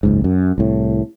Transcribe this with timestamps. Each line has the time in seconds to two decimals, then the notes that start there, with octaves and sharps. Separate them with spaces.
0.03 F#1 C#2 G#2
0.24 F#2
0.58 C2 A2